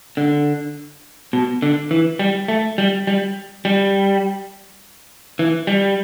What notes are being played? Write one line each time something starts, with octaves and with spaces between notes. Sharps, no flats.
D3
B2
D3
E3
G3
A3
G3
G3
G3
E3
G3